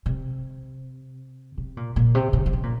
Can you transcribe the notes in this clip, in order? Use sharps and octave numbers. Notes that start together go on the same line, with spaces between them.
C3
C3
A#2
A#2
C3
C#3
D#3
C#3
A#2